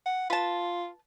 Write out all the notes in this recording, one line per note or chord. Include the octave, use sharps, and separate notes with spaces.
F#5
F4 B4 A5